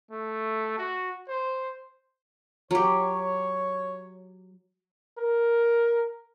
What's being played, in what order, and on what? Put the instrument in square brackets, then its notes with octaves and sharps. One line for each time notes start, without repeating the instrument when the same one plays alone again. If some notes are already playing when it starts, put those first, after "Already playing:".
[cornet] A3
F#4
C5
[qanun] F#3 G4 [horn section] C#5
[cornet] A#4